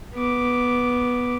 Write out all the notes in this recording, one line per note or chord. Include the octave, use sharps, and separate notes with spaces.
B3 D6